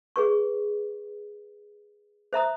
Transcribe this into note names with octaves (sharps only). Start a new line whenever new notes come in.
G#4 B4 C#6
C5 E5 A#5 D#6